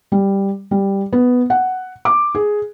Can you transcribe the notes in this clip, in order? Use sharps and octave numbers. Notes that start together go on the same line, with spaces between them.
G3
G3
B3
F#5
D6
G#4